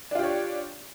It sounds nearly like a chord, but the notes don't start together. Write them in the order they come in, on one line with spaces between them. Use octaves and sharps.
D4 F4 G4 C#5